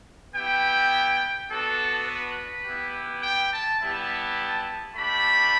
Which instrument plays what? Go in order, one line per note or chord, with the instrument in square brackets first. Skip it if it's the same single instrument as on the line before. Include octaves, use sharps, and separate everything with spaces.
[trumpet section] B3 E4 G4 G5
B3 D4 F#4 A4
B4
B3 E4 G4
G5
A5
G3 B3 E4 G4 A5
A3 D4 G4 B5